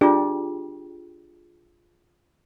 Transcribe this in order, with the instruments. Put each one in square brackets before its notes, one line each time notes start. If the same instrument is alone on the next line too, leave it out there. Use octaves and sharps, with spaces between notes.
[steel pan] D4 G4 [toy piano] F4 G#4